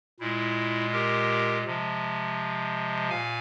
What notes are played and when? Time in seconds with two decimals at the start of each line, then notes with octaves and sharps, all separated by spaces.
0.20 A#2 G#3 E4
0.93 G4 A#4
1.65 C3 F3 G#3
3.10 A#2 F5 G#5